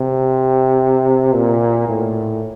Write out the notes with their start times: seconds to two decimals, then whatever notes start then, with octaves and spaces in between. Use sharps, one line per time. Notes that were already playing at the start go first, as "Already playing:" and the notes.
Already playing: C3
1.35 A#2
1.89 A2